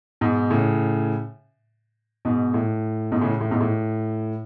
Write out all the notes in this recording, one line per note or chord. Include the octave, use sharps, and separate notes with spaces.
G#2 B2
A2 C#3
G#2 B2
A2
G#2 B2
A2 C#3
A2
G#2 B2
A2